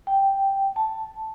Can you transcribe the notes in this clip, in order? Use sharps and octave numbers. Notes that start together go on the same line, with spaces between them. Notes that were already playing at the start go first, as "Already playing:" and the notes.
G5
A5